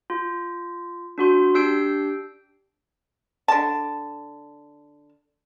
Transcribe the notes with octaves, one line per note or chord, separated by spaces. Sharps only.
F4
D4 F#4 C6
D4 G4 E6 G6 C7 D7
D3 A5